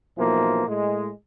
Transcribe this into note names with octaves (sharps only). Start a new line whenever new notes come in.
B1 E3 F3 A#3
A2 G#3